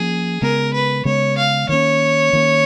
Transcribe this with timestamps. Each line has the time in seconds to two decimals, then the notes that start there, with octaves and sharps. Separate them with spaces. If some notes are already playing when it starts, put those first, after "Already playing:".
Already playing: F3 A#3 C#4 G#4
0.42 C#3 G#3 B3 A#4
0.74 B4
1.05 C#3 G#3 B3 C#5
1.38 F5
1.69 D#3 A#3 C#4 C#5
2.33 D#3 A#3 C#4